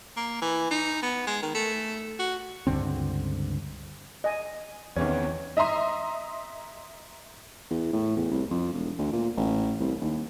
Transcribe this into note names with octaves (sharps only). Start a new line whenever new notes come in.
A#3
E3
D#4
B3
G#3
D#3
A3
F#4
C#2 G2 D3 C4
D#5 G#5
E2 D#3 E3 C4 C#4 C#5
D#5 E5 A#5 C6 D#6
E2
A2
E2
C2
F2
E1
D2
A#2
A1
C2
D#2